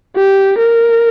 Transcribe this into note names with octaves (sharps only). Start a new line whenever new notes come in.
G4
A#4